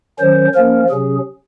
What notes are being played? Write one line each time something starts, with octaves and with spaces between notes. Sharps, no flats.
D#3 F#3 C#4 C5
F3 A#3 C#4 A#4
C3 F#3 C#4 G#4